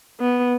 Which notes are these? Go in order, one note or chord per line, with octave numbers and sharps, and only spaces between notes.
B3